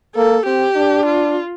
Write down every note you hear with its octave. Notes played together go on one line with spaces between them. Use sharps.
A#3 A4
C4 G4
D4
F4